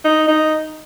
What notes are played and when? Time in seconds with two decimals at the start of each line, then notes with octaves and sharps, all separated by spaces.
0.04 D#4
0.28 D#4